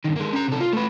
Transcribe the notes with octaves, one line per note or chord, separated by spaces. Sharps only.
G2 D#3
G#3 A#3
C#4 A#5
C3 A4
F4
A3 B4